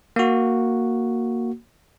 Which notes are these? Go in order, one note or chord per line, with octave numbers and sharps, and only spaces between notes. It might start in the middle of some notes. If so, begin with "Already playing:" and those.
A#3 F#4